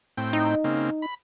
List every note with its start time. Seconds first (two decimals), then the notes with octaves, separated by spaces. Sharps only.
0.17 A2 C4 G5
0.33 D#4
0.64 C#3 A#3 C4
1.02 B5